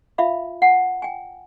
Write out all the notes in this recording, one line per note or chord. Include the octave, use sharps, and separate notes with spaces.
F4 E5 F5 B5
F#5 A5
G5 G#5